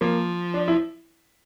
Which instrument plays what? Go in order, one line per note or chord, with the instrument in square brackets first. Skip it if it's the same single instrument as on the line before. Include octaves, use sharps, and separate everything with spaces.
[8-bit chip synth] F3 [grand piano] A#3
[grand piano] D4
E4